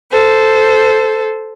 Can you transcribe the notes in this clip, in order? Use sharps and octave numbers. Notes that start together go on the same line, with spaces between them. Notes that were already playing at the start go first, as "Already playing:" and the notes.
A4 C5